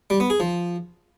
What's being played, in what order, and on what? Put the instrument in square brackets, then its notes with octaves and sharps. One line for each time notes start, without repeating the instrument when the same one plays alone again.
[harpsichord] G3
B3
G#4
F3